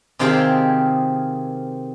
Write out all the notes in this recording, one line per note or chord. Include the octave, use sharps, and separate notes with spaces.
C3 D#3 C4 F4 G4 G#4